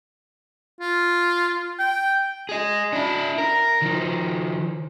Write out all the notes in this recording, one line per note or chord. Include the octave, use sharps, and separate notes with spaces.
F4
G5
G#4 D#5
D4 E4
A#4
D#3 F3